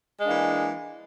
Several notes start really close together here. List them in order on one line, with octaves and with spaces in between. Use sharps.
G#3 D4 A#3 E3